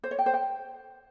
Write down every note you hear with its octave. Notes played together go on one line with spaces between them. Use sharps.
C5
C#5
G5
C5
G5